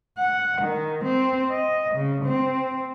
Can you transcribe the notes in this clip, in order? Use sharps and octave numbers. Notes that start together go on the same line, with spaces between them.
F#5
D#3
C4
D#5
C#3
C4